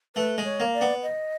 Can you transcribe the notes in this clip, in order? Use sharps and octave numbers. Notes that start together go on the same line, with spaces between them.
A3 B4
G#3
C#5
A#3
D5
B3
D#5